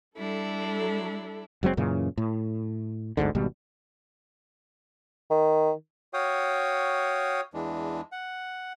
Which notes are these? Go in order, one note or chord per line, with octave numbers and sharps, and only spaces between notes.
G3 D4 E4 A4
F#1 F#3 G#3 C4
F#2 A#2 C#3 E3
A2
G1 D2 G#2 D3
G#1 B2 G3
D#3
F#4 C#5 F5 G5 D#6
E2 E3 G#3 D4
F#5